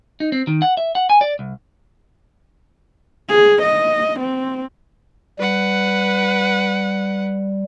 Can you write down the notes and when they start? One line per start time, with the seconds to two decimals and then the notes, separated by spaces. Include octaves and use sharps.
0.20 D#4
0.32 C4
0.47 D#3
0.62 F#5
0.77 E5
0.95 F#5
1.10 G#5
1.21 D5
1.39 C2
3.28 G#4
3.62 D#5
4.19 C4
5.39 G3 B4 F#5